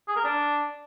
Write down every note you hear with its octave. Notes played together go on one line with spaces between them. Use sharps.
G#4
A#4
D4